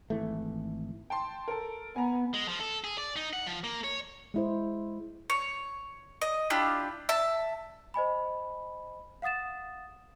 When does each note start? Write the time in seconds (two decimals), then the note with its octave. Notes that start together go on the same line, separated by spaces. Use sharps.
0.10 G#1 E3 A3
1.10 G5 A5 C6
1.48 A4 A#4
1.96 B3 G#5 A#5
2.34 G#3
2.48 F3
2.60 A4
2.84 G#4
2.98 D5
3.16 D#4
3.33 F#5
3.47 F3
3.64 A#3
3.84 C#5
4.34 G#3 E4 C5
5.30 C#5
6.22 D#5
6.50 D4 E4 F4 G4
7.09 E5 A5
7.94 C5 D#5 G#5 B5
9.22 F5 F#5 D#6 A6 E7